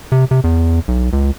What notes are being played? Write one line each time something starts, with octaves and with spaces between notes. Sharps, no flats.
C3
C3
E2
B1
C#2